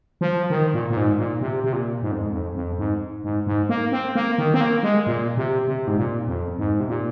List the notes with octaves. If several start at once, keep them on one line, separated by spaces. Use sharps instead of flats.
F3
D#3
A#2
A#2
G#2
A#2
C3
C3
A#2
G#2
F2
G#2
F2
F2
G#2
G#2
G#2
A#3
C4
A#3
D#3
C4
A#3
G#3
A#2
C3
C3
G#2
A#2
F2
G#2
C3
A#2